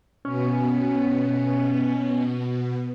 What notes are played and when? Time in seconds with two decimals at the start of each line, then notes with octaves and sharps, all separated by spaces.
0.25 B2 B3 C#4